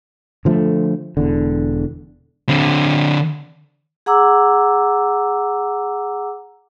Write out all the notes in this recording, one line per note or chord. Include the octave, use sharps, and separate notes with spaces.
D3 F3 A3
E1 E2 D3
D3 C4
G#4 F#5 A#5 D6 E6